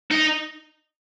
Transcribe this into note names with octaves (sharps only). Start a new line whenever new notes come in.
D#4